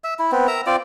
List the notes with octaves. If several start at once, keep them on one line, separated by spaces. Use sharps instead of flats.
E5
E4
B3 C4
A#4 E5 A#5
C4 F4 D5